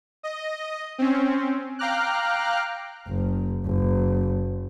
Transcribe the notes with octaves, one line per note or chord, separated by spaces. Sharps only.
D#5
C4 C#4
F5 G5 A#5 D6 F6 F#6
F#1
F#1